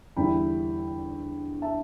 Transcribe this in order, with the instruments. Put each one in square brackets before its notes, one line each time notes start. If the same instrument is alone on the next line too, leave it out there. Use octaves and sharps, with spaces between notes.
[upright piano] E2 D3 G3 E4 G5 B5
E5 A5